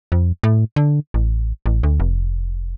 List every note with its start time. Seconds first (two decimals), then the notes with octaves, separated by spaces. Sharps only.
0.12 F2
0.43 A2
0.76 D3
1.14 A1
1.66 A1
1.83 D2
2.00 F1